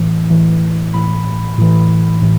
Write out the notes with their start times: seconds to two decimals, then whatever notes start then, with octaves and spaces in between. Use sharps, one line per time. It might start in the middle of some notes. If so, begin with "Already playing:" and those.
Already playing: A2 E3
0.30 A2 E3
0.94 A2 E3 B5
1.58 A2 E3
2.22 A2 E3